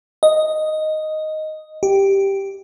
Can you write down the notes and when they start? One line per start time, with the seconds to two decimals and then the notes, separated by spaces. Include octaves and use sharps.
0.23 D#5
1.83 G4